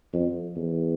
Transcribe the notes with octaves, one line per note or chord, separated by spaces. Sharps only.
F2
E2